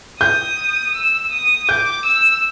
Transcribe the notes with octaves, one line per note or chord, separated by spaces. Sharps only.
D#6 G6
E6
D#6
D6 G6
E6